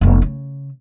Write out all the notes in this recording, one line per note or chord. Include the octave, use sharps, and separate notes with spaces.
F1 B3
C#3